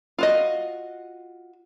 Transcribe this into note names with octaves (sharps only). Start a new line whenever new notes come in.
F4 F#4 D#5